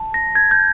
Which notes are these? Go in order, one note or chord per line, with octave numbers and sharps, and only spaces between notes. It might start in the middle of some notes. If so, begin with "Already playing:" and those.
Already playing: A5
A#6
G#6
G6